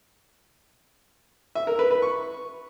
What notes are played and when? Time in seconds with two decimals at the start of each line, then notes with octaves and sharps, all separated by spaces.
1.55 E5
1.67 A#4
1.79 B4
1.91 B4
2.02 C#6